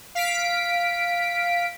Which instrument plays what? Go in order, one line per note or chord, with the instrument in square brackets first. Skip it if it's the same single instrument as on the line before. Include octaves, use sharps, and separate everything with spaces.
[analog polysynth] F5 B6 D7